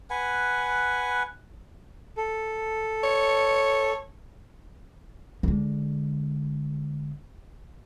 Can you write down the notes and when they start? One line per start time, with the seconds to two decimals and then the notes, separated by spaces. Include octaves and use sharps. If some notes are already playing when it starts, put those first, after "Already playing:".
0.10 B4 F#5 G#5
2.17 A4
3.03 C#5
5.43 D3 G#3